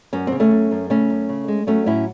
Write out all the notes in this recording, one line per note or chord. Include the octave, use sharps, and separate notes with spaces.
F#2 C#4
C#3 C4
A3 C#4
F#2
F#2
C#3 A3 C#4
F#2
C#3
G#3
F#3 A3 C#4
A2 C#4 E4